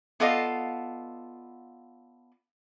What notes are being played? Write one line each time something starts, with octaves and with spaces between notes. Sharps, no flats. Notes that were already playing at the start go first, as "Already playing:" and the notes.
B3 F4 A4 D5 D#5 F5